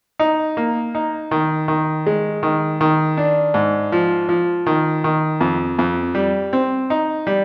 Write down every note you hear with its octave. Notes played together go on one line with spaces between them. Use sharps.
D#4
A#3
D#4
D#3
D#3
G#3
D#3
D#3
D4
G#2
F3
F3
D#3
D#3
F2
F2
G3
C4
D#4
G3